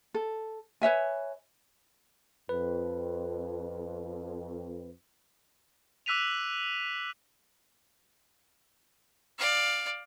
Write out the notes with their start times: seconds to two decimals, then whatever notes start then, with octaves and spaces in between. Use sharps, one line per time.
0.14 A4
0.82 B4 C#5 E5 G#5
2.49 F2 B4
6.06 D6 E6 F#6 B6 D#7 F7
9.39 D5 F5